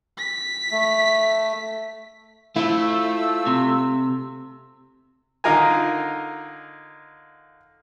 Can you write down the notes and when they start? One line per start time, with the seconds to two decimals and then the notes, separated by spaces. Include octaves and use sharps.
0.17 B6
0.72 A3
2.56 A3 E4 F4 C5 E6
3.46 C3
5.44 D3 D#4 F4 A#4 G#5